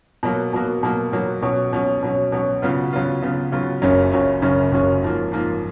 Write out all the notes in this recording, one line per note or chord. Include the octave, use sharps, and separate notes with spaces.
B2 F#3 A#3
B2 F#3 A#3
B2 F#3 A#3
B2 F#3 A#3
B2 F#3 C#4
B2 F#3 C#4
B2 F#3 C#4
B2 F#3 C#4
C#3 F#3 B3 F4
C#3 F#3 B3 F4
C#3 F#3 B3 F4
C#3 F#3 B3 F4
F#1 F#2 C#3 F#3 C#4
F#1 F#2 C#3 F#3 C#4
F#1 F#2 C#3 F#3 C#4
F#1 F#2 C#3 F#3 C#4
G#2 F3 A#3
G#2 F3 A#3